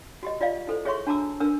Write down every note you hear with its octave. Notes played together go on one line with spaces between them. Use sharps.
F#4 G4 D#5
F4 D5 D#5 F5
E4 A4 C5
G#4 C#5 E5 C6 C#6
D4 F#4 A5 A#5 D6 E6
D4 A#4 B4 E6